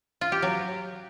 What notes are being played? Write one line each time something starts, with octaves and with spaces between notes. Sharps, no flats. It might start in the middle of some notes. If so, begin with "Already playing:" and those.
F4
G4
F#3